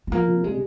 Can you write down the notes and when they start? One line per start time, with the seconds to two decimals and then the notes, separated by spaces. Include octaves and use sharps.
0.07 G#3
0.12 F3 A#3
0.28 C3
0.44 G3 G#3